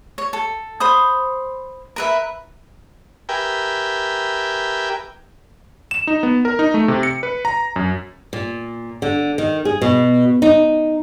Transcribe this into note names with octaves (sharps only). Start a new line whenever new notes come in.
C#5
A4
C5 B5 D#6
A#4 B4 E5
G4 A#4 B4 E5 G5 G#5
E7
D#4
B3
A#4
D#4
A3
C3
C#7
B4
A#5
F#2
A#2
D3
D#3
G#4
B2
D#4